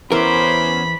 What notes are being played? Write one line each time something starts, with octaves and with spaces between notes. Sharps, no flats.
E2 E3 B3 C#4 A#4 C5 B5 D6